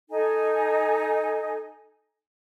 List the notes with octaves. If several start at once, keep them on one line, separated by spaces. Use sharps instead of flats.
D#4 A4 G#5